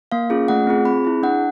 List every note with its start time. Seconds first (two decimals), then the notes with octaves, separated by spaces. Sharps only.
0.12 A#3 F5
0.30 C#4 F4 G#4
0.48 A3 F#5
0.67 C4 F4 G#4
0.85 C4 B5
1.05 E4 G#4
1.23 D4 F#5